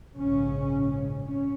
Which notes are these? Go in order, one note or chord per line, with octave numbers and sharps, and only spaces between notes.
A#1 G#2 C#3 C#4
C#4